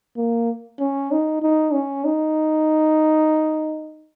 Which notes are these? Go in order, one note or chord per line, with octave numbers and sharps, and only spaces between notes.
A#3
C#4
D#4
D#4
C#4
D#4